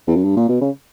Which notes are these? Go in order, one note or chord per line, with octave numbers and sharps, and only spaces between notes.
E2
F#2
G2
A#2
B2
C#3